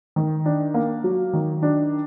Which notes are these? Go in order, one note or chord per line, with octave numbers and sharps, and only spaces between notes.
D#3
D4
A#3
F#3
D#3
D4